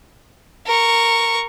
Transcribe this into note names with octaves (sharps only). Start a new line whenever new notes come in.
A#4 C#6